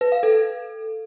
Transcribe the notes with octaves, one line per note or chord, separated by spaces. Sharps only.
B4
F5
A4